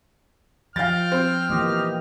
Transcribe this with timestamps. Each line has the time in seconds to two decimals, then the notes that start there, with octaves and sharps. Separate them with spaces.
0.76 F3 F5 G5 F6 G6 A6
1.12 C4
1.50 E3 A#3 G4 D#5